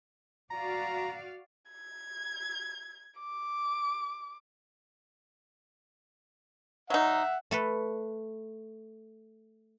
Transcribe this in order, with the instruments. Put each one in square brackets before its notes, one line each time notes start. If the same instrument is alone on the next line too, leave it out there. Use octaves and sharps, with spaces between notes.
[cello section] F#4 D5 F5 [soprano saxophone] A#5
[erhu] G#6
D6
[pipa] F#3 D#4 [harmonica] E5 F#5
[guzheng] A3 A4 B4